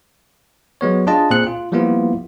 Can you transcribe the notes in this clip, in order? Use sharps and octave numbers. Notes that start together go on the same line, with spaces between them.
F#3 G#3 B3 C#5
D4 F4 G#4 D#5 A5
A#2 C4 G#4 F#6 C#7
F4
F3 G3 A#3 B3 E4 F4